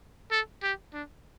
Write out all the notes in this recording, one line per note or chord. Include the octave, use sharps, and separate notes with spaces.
A4
G4
D4